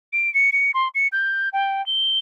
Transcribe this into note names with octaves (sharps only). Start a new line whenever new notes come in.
D7
C#7
C#7
C6
C#7
G6
G5
G7